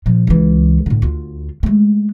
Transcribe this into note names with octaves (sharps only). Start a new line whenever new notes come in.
A#2 F3
C#2 E3
A2 D3
D2 F4
G#3 A3